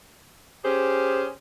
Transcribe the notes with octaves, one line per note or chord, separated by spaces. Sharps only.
C#4 G4 G#4 C5